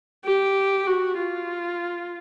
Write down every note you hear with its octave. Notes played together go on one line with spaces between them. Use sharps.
G4
F#4
F4